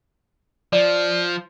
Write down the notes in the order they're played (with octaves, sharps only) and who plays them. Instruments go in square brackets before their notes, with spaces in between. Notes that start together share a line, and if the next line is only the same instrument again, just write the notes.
[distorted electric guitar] F3 [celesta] D5